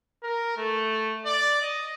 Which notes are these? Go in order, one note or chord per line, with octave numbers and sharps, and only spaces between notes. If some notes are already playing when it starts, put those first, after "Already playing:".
A#4
A3
D5
D#5